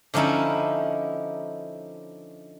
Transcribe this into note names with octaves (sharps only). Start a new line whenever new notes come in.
D3 F3 C#4 D#4 E4